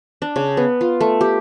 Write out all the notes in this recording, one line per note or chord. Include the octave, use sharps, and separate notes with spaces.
D4
C#3
B3
F4
A3
G4